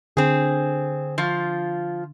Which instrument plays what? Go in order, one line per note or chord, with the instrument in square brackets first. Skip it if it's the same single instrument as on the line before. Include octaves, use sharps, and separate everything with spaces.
[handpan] D3 [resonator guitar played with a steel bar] C4 G#4
[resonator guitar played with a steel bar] F3 F4